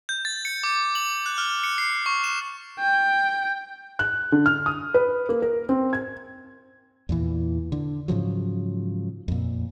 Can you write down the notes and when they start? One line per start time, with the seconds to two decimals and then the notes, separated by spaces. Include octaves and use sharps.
0.09 G6
0.25 A6
0.45 C#7
0.64 D6
0.95 F#7
1.26 F#6
1.38 F6
1.64 C#7
1.78 C7
2.06 C#6
2.24 E7
2.79 G5
3.99 F#6
4.32 D3
4.46 F6
4.66 D#6
4.94 B4
5.29 A#3
5.42 A#4
5.69 C4
5.93 G#6
7.09 E2 A#2 E3
7.72 D3
8.08 G#2 C#3 F3 F#3
9.28 F2 A#2